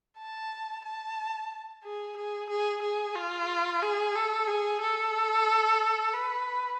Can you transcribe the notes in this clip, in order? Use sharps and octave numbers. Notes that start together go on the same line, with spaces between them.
A5
A5
G#4
G#4
G#4
G#4
F4
G#4
A4
G#4
A4
B4